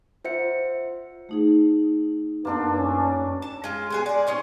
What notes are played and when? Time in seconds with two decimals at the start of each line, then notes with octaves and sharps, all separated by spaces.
0.25 F4 C5 E5 F#5 C#7
1.29 A3 D#4 G#4
2.45 F#2 A#3 B3 D4 A4 C6
2.77 C#4
3.42 A5
3.64 G#3 F4
3.90 G#3 B3 G#4
4.06 G#4 D5
4.27 C#4 D#4 C5